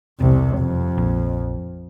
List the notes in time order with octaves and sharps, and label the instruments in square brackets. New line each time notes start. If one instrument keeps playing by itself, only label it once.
[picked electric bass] E1 [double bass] C2 C3
[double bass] F2
[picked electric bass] A#1